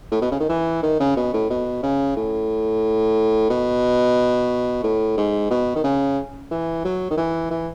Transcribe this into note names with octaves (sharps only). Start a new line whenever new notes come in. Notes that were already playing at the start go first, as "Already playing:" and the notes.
A2
B2
C#3
D#3
E3
D#3
C#3
B2
A2
B2
C#3
A2
B2
A2
G#2
B2
D#3
C#3
E3
F#3
D#3
E3
E3